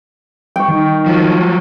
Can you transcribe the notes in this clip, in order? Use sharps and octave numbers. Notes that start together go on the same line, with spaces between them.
G3 G5 C#6
D#3
F3 F#3